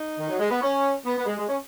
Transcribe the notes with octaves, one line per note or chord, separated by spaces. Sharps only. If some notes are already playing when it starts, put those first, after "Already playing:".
Already playing: D#4
D#3
F#3
G#3
B3
C#4
B3
B3
G#3
G#3
C#4